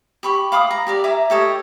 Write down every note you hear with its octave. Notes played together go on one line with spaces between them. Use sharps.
G4 B5 C#6
F5 B5 D6 D#6
A#5
G4 A#4 D5
E5 G#5 A#5 D6
G4 A4 C#5 D#5